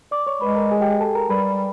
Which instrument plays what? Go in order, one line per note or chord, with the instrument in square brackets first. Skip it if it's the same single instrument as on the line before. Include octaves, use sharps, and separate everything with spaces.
[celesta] D5 D6
C#5 C#6
[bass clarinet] G#3 [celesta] B4 B5
[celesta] A#4 A#5
G#4 G#5
G4 G5
G#4 G#5
A4 A5
A#4 A#5
[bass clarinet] G3 [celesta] B4 B5